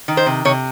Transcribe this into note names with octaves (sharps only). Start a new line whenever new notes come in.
D#3
C5
C3
C3 C#5